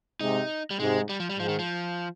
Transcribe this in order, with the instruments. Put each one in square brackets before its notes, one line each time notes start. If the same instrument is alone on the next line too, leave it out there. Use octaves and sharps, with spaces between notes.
[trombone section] G#2 C3 [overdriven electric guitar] D#4
[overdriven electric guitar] G3
[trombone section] G#2 C3 [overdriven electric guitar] G#3
[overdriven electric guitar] G3
F3
G3
[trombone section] G#2 [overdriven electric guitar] F3
[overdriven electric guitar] D#3
F3